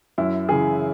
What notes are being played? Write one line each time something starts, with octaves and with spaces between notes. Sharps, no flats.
F#2 E4
C#3 E3 G#4